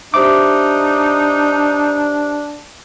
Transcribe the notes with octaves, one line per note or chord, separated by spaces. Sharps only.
D4 D#4 G4 C5 E5 D6